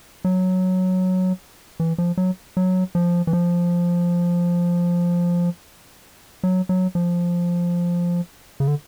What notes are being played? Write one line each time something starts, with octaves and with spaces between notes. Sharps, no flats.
F#3
E3
F3
F#3
F#3
F3
E3
F3
F#3
F#3
F3
C#3
D3